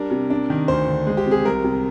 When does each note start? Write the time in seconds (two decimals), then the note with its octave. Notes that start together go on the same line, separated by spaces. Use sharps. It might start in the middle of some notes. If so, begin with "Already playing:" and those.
Already playing: G3 D4 A#4
0.11 C3
0.30 D4
0.50 D#3
0.68 D2 C5
0.88 D3
1.07 G#3
1.17 G4
1.26 C3 G#4
1.45 C2 A#4
1.64 C3